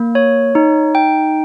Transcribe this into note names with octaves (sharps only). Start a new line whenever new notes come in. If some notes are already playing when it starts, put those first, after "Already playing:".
Already playing: A#3
C#5
D#4
G5